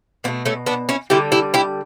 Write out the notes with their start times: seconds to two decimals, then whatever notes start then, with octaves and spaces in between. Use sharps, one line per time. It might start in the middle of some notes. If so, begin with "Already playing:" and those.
0.24 B2 B3
0.28 A3
0.46 A3 C#4
0.66 B3 D4
0.89 C#4 E4
1.10 D3 G3 E4 G4
1.32 E4 G4
1.54 E4 G4